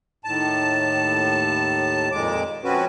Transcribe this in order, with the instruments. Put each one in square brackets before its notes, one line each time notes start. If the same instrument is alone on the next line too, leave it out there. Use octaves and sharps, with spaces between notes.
[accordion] D#2 A2 A5
F2 A#2 G#3 D6
F3 C4 C#4 F#4 B4